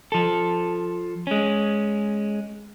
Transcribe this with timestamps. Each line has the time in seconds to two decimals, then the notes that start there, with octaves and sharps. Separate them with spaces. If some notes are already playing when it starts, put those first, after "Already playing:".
0.12 F3 A4
1.27 G#3 C#4